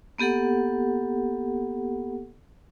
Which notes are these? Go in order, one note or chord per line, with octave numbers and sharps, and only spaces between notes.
A#3 B3 G4 A4 F#5